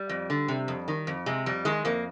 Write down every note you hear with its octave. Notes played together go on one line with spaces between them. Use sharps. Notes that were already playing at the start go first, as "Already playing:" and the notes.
Already playing: G3
F2
D3
C3
F2
D#3
F2
C3 G#3
F2 G3
D#3 G#3
F2 A#3